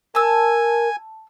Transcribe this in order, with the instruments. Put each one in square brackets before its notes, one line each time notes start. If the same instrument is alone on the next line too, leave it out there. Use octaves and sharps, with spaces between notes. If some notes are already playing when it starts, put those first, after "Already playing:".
[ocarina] A#4 [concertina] G#5 [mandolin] A5 E6